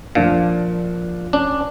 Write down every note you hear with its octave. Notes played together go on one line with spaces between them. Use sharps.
A#2 F3 D4 F5
C#4 D4